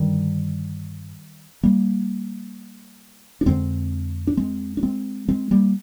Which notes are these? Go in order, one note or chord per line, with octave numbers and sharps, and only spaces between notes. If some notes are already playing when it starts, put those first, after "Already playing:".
Already playing: G2 D3 D#3 G3
G3 A#3
D4
F2 D3 G#3 C4
D4
G#3 C4
D4
G#3 C4
G#3 C4
G3 A#3